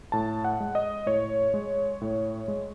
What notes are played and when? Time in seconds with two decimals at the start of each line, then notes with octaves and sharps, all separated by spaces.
0.12 A2 A5
0.45 F#5
0.60 G#3
0.75 D#5
1.06 A2 C#5
1.54 G#3
2.01 A2
2.48 G#3